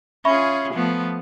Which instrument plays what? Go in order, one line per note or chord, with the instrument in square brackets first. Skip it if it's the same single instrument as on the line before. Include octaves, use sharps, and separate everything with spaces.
[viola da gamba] C#4 F4 G#4 [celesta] E5 B5 C#6
[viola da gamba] F3 A3 B3